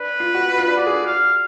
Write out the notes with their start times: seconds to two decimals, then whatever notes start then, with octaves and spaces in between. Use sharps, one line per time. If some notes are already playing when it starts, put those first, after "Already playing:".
Already playing: D4 B4
0.20 F4
0.34 F#4
0.49 F#4
0.58 F4
0.68 D4
0.77 F#4 D5
0.87 G#4
0.96 F#4
1.06 F5